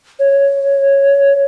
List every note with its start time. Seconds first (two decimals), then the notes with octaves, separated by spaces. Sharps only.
0.19 C#5